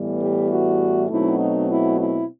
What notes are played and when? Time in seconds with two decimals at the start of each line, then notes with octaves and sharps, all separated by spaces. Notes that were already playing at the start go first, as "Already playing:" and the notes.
Already playing: A2 E3 G3 B3
0.21 G4
0.50 F#4
1.09 B2 F#3 A3 C4 D#4 E4
1.39 D#4
1.68 E4
1.97 E4